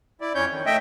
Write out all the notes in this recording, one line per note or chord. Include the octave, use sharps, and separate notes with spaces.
E4 D5
F2 C#4 C#5 G6
D#3
A3 D#5 E5 G5